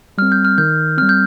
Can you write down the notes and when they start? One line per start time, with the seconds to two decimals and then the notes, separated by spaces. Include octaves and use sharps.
0.18 G3 C4 F6
0.32 G6
0.45 F6
0.58 D#3 G6
0.98 G3 C4 F6
1.09 G6